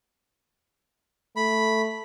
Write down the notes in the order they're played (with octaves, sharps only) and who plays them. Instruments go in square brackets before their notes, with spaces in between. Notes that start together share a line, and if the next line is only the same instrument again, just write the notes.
[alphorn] A3 [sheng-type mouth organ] B5